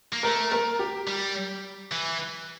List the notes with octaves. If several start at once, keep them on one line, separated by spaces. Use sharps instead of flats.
A#3
A3 A#4
A#4
G4
G3
E3